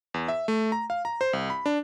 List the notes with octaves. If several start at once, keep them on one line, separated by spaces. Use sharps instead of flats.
E2
E5
A3
A#5
F5
A#5
C5
C2
B5
D4